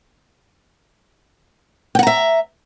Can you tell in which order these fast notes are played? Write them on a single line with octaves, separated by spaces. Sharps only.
G5 F#5 A#5 E5